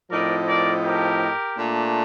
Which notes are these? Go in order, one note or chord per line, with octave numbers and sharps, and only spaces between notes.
A2 F3 C4 D#4 A#4 D5
A#4 D5
G4 A#4
A#2 A3 D4